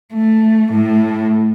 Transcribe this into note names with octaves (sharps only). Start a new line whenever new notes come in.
A3
A2 A3